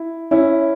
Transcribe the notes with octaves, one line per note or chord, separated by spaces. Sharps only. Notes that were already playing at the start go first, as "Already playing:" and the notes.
Already playing: E4
C#4 E4